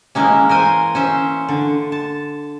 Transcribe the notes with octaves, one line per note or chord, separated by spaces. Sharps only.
E3 G#3 A#3 C#4
A#4 C5 G#5
C#4 C5 E5
D3
A5